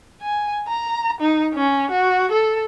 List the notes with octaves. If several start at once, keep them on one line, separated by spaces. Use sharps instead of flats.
G#5
A#5
D#4
C#4
F#4
A4